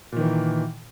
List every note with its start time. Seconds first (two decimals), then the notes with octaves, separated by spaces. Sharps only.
0.12 A#2
0.16 D#3
0.21 E3